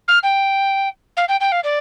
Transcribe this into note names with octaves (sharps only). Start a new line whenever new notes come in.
F6
G5
F5
G5
G5
F5
D5